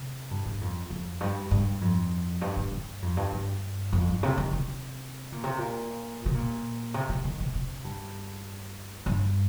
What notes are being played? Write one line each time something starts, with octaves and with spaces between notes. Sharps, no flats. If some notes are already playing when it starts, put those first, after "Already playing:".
Already playing: C3
G2
G2
F2
F2
G2
G2
F2
G2
G2
G2
F2
G2
G2
F2
G2
C3
D#3
C3
A#2
C3
A#2
C3
A#2
C3
C3
D#3
C3
C3
G2
G2